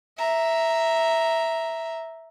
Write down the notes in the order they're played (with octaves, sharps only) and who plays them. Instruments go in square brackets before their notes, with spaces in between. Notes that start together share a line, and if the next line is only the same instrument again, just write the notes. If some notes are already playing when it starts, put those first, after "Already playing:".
[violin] E5 A#5